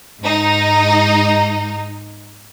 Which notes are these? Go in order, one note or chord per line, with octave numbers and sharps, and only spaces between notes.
G#2 D#4